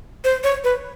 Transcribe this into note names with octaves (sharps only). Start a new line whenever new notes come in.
C5
C#5
B4